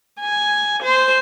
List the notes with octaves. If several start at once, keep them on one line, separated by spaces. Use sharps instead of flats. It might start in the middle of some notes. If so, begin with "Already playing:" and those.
G#5
C5